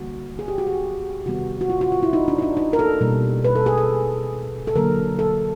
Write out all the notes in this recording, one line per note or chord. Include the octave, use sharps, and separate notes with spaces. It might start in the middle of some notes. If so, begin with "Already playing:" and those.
Already playing: D3 G3 A#3 F#4
G#4
G4
F#4
G4
C3 D#3 G3 B3 F#4
F#4
F4
F#4
F4
E4
D#4
D4
D#4
D4
D#4
A#4
A4
B2 G3 A#3
B4
A4
G#4
A4
A4
D3 F#3 A#3 A#4
A4